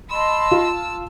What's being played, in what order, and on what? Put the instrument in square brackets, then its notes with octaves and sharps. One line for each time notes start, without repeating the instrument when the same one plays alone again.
[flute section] D#5 B5 C6 [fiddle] A5 E6
[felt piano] F4